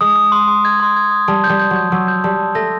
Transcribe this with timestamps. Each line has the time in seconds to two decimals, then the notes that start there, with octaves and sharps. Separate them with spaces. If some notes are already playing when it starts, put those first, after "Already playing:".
0.01 G#3 D#6
0.16 D#6
0.32 C6
0.48 C6
0.65 G#6
0.80 C6
0.96 G#6
1.11 D#6
1.28 G3 A5
1.44 G6
1.49 G3
1.59 G6
1.70 F#3
1.76 G6
1.92 F#3 E6
2.08 G6
2.24 G3 A5
2.39 A5
2.55 A3 A#6